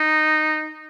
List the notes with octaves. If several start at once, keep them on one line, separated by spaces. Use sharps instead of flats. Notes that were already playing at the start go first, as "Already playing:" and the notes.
Already playing: D#4